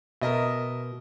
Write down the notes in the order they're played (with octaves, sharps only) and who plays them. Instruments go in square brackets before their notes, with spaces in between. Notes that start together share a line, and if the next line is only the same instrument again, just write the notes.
[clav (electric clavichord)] B2 [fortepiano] A#4 D#5 E5